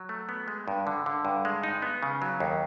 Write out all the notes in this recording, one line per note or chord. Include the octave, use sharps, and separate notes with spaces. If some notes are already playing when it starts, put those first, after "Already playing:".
Already playing: F#3
A3
B3
G#3
G2
D3
D3
G2
G#3
D#4
B3
C#3
F#3
D#2